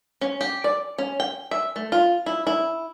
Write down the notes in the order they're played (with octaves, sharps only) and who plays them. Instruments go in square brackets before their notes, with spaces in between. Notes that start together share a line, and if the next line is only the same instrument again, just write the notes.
[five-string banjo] C#4
G4
D5
C#4
G5
E5
A3
F4
E4
E4